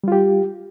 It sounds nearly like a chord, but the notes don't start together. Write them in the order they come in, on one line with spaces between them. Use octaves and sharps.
G3 F4 G4